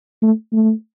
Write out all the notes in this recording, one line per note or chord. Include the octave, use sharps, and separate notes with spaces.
A3
A3